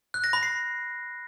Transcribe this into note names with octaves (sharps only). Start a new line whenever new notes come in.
F#6
A#6
B5
C7